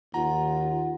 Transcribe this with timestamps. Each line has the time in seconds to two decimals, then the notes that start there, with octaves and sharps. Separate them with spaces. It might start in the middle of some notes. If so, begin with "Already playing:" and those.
0.14 D#2 F4 F#5 A#5